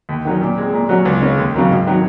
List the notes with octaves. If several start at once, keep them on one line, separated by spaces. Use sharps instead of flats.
D#2
D#3 F#3 C#4
A#2
G#3 C4
A#2
F#3 C#4 F#4
C#2
C#3 G#3 C#4
D#2
C#3 F#3 A#3
G#1
D#3 F#3